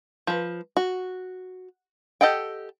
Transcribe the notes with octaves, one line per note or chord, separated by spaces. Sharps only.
F3 B4
F#4
G4 A4 D#5 F#5 G5